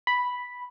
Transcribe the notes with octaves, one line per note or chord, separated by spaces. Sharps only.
B5